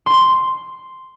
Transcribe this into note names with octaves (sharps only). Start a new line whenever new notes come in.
C6